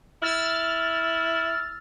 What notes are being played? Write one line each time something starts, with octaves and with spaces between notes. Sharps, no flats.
E4 E6 F6 A6